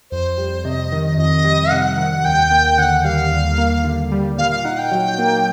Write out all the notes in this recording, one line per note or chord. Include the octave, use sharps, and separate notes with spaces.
F2 C5
G3
C3 D#5
D#3
F2 D#5
G3
C3 F#5
D#3
D#2 G5
A#3
D3 F#5
G3 F5
D#2
A#3
D3
G3
A#2 F5
F5
D#4 F#5
G5
F#3
A#3